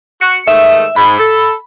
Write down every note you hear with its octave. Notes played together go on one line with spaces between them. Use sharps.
F#4 C#7
G#2 D#3 A3 E5
G#2 B5
A4